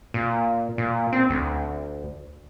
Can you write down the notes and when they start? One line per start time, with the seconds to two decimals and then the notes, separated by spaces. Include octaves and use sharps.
0.14 A#2
0.78 A#2
1.13 C4
1.30 D2